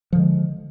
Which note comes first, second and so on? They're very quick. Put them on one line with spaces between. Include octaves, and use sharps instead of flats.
F3 D3 G#3